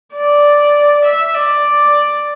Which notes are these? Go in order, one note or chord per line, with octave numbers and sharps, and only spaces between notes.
D5
E5
D5